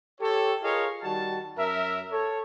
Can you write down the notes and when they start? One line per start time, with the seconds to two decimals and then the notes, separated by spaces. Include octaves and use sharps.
0.20 G4 A4 C#5
0.63 F4 G#4 A#4 C#5 D#5 F5
1.02 D#3 G3 F#4 A5
1.58 F#2 A#4 E5
2.12 A4 C#5